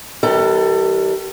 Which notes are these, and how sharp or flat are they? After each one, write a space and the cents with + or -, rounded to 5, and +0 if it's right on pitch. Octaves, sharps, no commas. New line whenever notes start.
D#3 +45 G3 -25 A4 +30